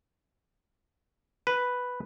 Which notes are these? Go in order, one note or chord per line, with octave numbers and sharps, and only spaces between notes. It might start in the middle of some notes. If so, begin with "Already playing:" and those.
B4